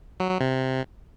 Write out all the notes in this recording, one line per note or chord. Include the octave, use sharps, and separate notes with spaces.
F#3
F#3
C3